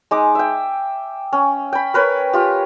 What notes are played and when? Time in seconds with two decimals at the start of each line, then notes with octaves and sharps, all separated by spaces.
0.11 G#3 D#4 D6
0.35 E5 G5
1.33 C#4
1.73 G5 B5
1.94 A#4 B4 C#5 G5
2.33 F4 G4